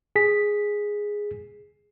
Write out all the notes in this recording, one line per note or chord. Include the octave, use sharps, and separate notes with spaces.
G#4 B6